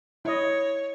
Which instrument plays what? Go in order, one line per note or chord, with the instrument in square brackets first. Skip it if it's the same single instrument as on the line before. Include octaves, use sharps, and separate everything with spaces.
[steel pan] E4 D#5 [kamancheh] C#5